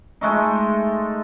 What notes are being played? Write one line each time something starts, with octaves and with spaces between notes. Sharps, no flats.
G#3 A3 D#4